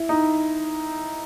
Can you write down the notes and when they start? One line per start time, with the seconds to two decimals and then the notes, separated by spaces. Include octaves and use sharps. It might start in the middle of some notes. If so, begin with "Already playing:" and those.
Already playing: E4
0.09 D#4